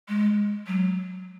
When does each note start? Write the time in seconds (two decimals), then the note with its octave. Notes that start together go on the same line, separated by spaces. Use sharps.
0.08 G#3
0.67 F#3